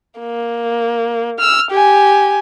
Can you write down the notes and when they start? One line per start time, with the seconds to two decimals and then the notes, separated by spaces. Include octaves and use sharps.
0.19 A#3
1.39 E6 F6
1.71 G4 G#5